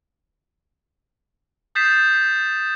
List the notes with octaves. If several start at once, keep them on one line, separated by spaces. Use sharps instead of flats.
D#6 G6 A6 B6 C7 E7